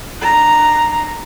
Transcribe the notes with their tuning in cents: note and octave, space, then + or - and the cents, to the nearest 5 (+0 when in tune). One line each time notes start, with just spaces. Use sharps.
D4 +35 A#5 +0